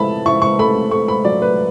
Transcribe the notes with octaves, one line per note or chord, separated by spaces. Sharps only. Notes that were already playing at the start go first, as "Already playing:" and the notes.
Already playing: A3 E4 A5 B5
E4 C#6
C#6
A3 B5
A3 C#6
B5
F#3 D5
B4